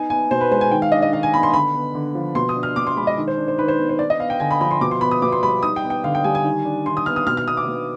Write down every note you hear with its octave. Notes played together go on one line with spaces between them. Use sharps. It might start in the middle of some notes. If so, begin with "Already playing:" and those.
Already playing: B3 D#4 G#5
B3 G#5
B2 C5
B4
G#3 C5
G#5
D#3 G5
F5
D4 D#5
D#5
D#3 F5
G#5
B3 B5
C6
D3 B5
B3
D3
F3
B2 C6
D#6
D4
F6
B2 D6
C6
G#3 B5
D#5
D#3
C5
D4
C5
D#3 B4
C5
B3
C5
D4 D5
D#5
B3 F5
G5
D3 G#5
B5
F3 B5
C6
B2 D6
C6
B3 B5
D#6
B2 D6
C6
G3 B5
D#4 D#6
G5
B3
G5
D3 F5
G5
G3 G#5
G#5
D#3
D4
D#3 C6
D#6
B3 F6
D#6
B2 F6
F6
B3 D#6
D6
B2